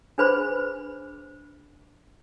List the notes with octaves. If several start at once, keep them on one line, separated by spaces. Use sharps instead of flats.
D4 G#4 B4 C5 B5